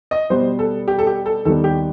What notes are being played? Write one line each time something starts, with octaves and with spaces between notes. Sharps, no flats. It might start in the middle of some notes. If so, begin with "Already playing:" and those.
D#5
B2 G3 B3 C5
A4
G4
A4
G4
A4
D#2 D#3 G3 B3 A4
G4